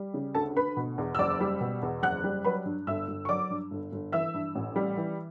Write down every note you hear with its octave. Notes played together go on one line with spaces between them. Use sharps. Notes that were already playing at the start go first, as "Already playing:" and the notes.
Already playing: G3
C#3
D2 A4 A5
D2 B4 B5
B2
E2
E6
F#1 D5 D6
G3
B2
E2
F#1 F#5 F#6
G3
F#3 B4 B5
G2
G1 E5 E6
G1
C#6
F#3 D5 D6
G2
G1
G1
E3 E5 E6
G2
A1
G3
E3